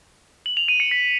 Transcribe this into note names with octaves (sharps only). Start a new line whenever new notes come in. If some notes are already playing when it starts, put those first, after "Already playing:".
F#7
F7
D#7
C#7
B6